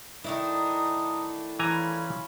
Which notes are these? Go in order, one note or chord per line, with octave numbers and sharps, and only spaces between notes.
D#3 A3 D4 E4 A#5 D#6
E3 C#4 F4 G#5 A#5 B5